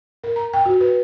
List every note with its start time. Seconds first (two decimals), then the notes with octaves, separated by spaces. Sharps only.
0.24 A#4
0.36 A#5
0.53 G5
0.66 F#4
0.81 B4